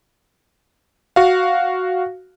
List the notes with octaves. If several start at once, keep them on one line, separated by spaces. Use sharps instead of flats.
F#4 F5